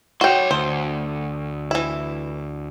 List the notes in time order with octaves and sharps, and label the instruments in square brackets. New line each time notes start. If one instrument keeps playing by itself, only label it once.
[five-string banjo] F#4 G5 [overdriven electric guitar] C#5 C6
[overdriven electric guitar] D2 [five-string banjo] C5
[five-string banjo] E3 E4